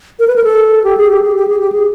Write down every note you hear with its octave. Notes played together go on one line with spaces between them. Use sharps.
A#4
B4
A#4
A4
G4
G#4
G4
G#4
G4
G#4
G4
G#4